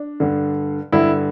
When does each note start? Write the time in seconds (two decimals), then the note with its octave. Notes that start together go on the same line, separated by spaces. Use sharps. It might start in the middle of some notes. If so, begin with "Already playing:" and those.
Already playing: D4
0.20 G2 D3
0.92 G2 D3 E4